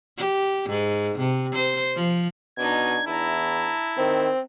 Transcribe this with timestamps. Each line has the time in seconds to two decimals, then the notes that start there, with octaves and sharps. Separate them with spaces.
0.17 G4
0.70 G#2
1.19 C3
1.55 C5
1.96 F3
2.58 B2 D4 D#4 G#6
3.07 E2 E4 A5 A#5
3.98 D#3 C4